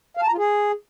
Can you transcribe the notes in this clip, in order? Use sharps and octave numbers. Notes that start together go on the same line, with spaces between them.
F5
A5
A#5
F4
G#4